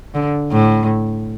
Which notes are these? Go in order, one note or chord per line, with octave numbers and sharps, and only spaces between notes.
D3
A2